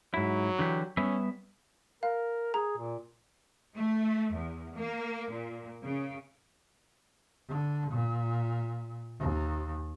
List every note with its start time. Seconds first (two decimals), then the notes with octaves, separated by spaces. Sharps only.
0.14 G#2 F#3 E4
0.59 D3 E3 G4
0.97 G3 B3 C#4 E5
2.03 A#4 F5
2.54 G#4 A#5
2.77 A#2
3.76 A3
4.33 E2
4.75 A#3
5.30 A#2
5.82 C#3
7.49 D3
7.91 A#2
9.19 D#2